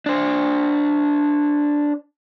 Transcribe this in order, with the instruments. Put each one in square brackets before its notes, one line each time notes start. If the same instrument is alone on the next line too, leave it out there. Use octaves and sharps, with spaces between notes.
[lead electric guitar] D4 C5